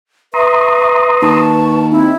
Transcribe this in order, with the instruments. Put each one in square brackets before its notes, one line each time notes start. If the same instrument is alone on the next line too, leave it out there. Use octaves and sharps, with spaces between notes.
[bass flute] B4 [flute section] E5 C#6 [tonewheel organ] A#5 C6 D#6
[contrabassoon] D#2 [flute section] A5 C#6
[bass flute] C4 [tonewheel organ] D#4 [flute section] E4